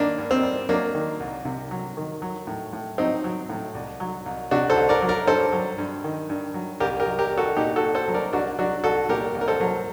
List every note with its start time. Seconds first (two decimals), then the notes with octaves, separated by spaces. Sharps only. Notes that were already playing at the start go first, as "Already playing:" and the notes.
Already playing: G2 D#3 A#3 D4
0.18 G2
0.31 C4
0.43 G3
0.69 F#3 A#3 D4
0.95 D#3
1.20 C2
1.45 C3
1.71 F#3
1.97 D#3
2.22 F#3
2.47 A2
2.73 A2
2.98 F#3 C4 D#4
3.24 F#3
3.50 A2
3.75 C2
4.00 F#3
4.26 C2
4.51 C3 D4 F#4
4.70 A4 C5
4.76 C2
4.89 A#4 D5
5.02 F#3
5.08 A#4 D5
5.27 G2 A4 C5
5.53 F#3
5.78 G2
6.04 D#3
6.30 G2
6.54 F#3
6.80 C2 G4 A#4
7.00 G4 A#4
7.05 F#3
7.19 G4 A#4
7.31 C2
7.38 F#4 A4
7.56 A#2 D#4 G4
7.76 F#4 A4
7.82 C2
7.95 A4 C5
8.08 F#3
8.14 A#4 D5
8.33 C2 D4 F#4
8.59 F#3 D4 F#4
8.84 C2 F#4 A4
9.09 A#2 G4 A#4
9.35 C2
9.41 A#4
9.48 A4 C5
9.60 F#3